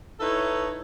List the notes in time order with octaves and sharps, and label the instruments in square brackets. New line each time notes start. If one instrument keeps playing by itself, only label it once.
[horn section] D#4 E4 A4 B4 C#5